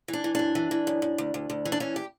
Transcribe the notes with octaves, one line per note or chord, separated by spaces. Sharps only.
E3
D4
E3
F#2 D4
E3
E3
F#2
F#2
D2
D2
D2
E3
D4
E3 C#4
G4